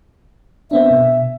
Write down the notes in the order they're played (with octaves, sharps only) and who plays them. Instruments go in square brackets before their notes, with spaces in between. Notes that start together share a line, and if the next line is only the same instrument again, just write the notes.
[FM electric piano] B3 C4 D4 [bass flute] E5
[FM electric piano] B2